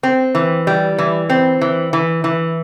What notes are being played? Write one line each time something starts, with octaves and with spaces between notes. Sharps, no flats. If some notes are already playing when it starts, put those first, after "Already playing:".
C4
E3
G3
E3
C4
E3
E3
E3